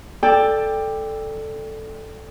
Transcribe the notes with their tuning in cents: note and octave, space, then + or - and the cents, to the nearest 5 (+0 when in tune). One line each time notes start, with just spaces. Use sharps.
A4 +0 D5 +10 G5 +15